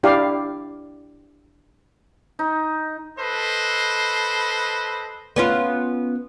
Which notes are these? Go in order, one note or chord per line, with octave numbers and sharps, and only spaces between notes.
D4 E4 G4 D5 F5
D#4
A4 B4 C5 D#5
B3 C#4 F4